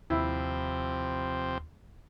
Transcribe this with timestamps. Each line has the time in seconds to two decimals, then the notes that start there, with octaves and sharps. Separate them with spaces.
0.10 D#2 C3 F3 C4 E4